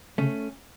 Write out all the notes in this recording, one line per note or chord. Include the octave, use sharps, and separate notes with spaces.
C#3 A3 C#4